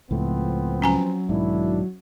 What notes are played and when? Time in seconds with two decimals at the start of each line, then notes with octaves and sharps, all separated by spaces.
0.11 C#2 A2 F3 A3 B3 C4
0.82 F#3 C#4 G#5 A#5
1.29 B1 G#2 D#3 D4 E4